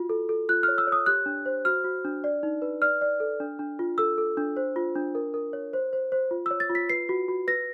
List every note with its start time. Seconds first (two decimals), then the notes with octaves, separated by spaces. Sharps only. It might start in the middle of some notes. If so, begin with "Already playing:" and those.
Already playing: F4 F#4
0.10 A4
0.29 A4
0.49 F4 F#6
0.63 F6
0.68 C#5
0.78 E6
0.87 C#5 D#6
1.06 G4 F#6
1.26 D4
1.46 C5
1.65 F#4 F6
1.84 F#4
2.05 D4
2.24 D5
2.43 D#4
2.62 B4
2.82 D5 F6
3.01 D5
3.20 A4
3.40 D4
3.59 D4
3.79 F4
3.98 A4 E6
4.18 A4
4.37 D4
4.57 C5
4.76 F4
4.95 D4
5.15 A#4
5.34 A#4
5.53 C#5
5.73 C5
5.93 C5
6.12 C5
6.31 F4
6.46 C#5 E6
6.60 A6
6.70 F4
6.75 B6
6.89 B4 C7
7.09 F#4
7.28 F#4
7.47 B4 A#6